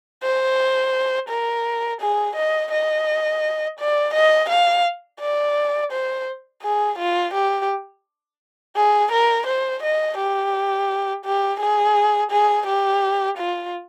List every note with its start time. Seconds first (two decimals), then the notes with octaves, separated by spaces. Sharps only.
0.23 C5
1.29 A#4
2.01 G#4
2.36 D#5
2.72 D#5
3.79 D5
4.14 D#5
4.50 F5
5.20 D5
5.92 C5
6.63 G#4
6.99 F4
7.34 G4
8.76 G#4
9.12 A#4
9.47 C5
9.83 D#5
10.18 G4
11.25 G4
11.60 G#4
12.31 G#4
12.67 G4
13.38 F4